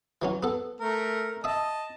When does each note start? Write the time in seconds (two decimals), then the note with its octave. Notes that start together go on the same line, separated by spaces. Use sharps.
0.22 E3 F#3 C#4
0.43 B3 A4
0.81 A3 A#4
1.44 D#5 E5 A5 D#6